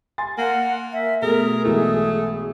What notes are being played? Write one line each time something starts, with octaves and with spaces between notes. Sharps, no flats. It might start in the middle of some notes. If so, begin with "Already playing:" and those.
G#5 C6 A6
A#3 F#5
E5
B2 A3 G#4 A#4
B1 E3 G#3 A3